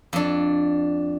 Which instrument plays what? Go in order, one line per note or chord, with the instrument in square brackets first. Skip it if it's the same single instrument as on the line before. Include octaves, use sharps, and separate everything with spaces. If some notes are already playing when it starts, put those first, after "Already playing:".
[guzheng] F2 D4